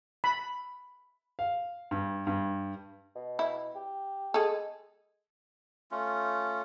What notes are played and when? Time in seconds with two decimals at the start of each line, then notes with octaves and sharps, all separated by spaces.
0.24 B5
1.39 F5
1.91 G2
2.27 G2
3.16 B2
3.39 E4
3.75 G4
4.34 G#3 G#4 A4
5.91 A3 C#4 F4